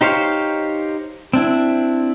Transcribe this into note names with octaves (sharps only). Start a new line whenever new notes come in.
D#4 G4 C5 C#5 F5
C4 D4 E4